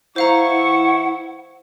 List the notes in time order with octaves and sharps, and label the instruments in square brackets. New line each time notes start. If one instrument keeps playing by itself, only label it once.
[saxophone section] E3 E4 [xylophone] C5 F5 A#5 [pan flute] F#5 [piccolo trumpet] C#6